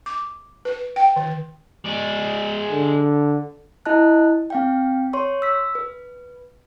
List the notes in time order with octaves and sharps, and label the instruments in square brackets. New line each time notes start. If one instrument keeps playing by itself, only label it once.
[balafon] D6
B4
G5
D#3
[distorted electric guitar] G#3 D5
[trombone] D3
[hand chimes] E4 D#5 A5 F#6
C4 F5 G5
C#5 C6 C#6
E6 B6
B4